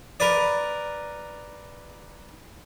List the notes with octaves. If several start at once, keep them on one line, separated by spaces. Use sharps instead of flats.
A#4 B4 D5